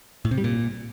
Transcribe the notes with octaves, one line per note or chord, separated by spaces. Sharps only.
A2
C3
G3
A#2